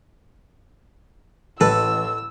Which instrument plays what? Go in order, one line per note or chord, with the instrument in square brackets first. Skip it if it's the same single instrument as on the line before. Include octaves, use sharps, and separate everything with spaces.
[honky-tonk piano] A1 [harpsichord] A4 [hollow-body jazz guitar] B4 [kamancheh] E6